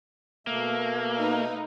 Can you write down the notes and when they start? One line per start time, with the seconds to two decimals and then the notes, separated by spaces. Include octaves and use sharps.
0.47 B2 A3 A#3 E5
1.20 D#4 B4